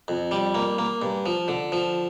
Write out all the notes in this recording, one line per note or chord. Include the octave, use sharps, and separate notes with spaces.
F2
G3
A#3
A#3
G2
F3
D3
F3